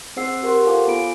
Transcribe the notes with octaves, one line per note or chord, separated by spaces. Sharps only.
C4 G#4 C5 F#5 E6 C7
G4 A#4 F#5 C6 C#6
F4 A4 C5 F5 G#5 D6
B3 F4 G#5 B5 D7